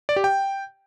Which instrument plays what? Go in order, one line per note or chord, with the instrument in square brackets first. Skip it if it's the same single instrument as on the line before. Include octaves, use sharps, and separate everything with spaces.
[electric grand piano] D5
G4
G5